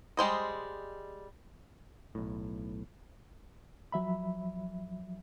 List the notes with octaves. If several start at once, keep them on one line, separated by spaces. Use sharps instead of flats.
G3 G#3 C5 D#5
B1 A2
F3 F#3 E5 B5